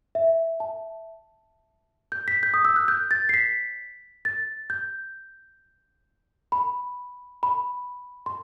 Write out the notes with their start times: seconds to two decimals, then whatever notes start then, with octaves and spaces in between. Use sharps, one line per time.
0.15 E5
0.60 A5
2.12 G6
2.28 B6
2.43 G6
2.54 D#6
2.65 E6
2.76 F#6
2.88 G6
3.11 A6
3.29 C7
3.34 B6
4.25 A6
4.70 G6
6.52 B5
7.43 B5
8.26 C6